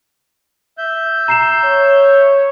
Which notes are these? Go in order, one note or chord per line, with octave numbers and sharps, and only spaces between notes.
E5 G6
A#5 C7 E7
C#5